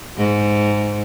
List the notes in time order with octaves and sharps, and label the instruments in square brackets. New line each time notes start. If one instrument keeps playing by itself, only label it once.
[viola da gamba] G#2